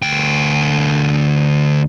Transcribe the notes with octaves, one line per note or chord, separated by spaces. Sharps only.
D2 G5